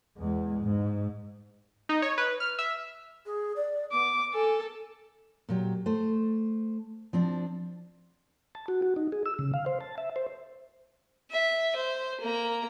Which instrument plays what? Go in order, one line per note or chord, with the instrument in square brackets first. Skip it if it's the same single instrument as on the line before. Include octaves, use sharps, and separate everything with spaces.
[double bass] E2 G#3
G#2
[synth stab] D#4
C#5
B4
F6
E5
[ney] G#4
D5
[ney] B3 [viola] D6
[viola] A4 [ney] G#5
[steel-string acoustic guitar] A#2 F#3 G4
A3 C5
F3 C4 D4
[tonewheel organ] A5
F#4
F#4
D#4
G#4
E6
C#3
F5
C5
A5
E5
C5
[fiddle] E5
C5
A#3 A#5